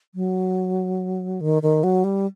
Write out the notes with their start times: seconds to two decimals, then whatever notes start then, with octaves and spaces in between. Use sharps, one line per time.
0.15 F#3
1.41 D#3
1.62 D#3
1.84 F#3
2.04 G3